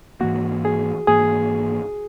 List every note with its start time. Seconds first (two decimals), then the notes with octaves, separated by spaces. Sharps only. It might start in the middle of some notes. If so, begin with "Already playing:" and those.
0.21 G#2 E3 A#3 F#4
0.65 G#4
1.07 G#2 E3 A#3 G#4